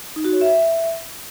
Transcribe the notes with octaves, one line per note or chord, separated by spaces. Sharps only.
D#4
F#4
C#5
E5